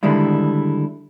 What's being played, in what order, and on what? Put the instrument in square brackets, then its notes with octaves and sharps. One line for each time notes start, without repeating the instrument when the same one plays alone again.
[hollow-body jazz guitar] D3 D#3 G3 G#3 E4